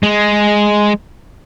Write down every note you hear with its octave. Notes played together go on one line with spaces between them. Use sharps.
G#3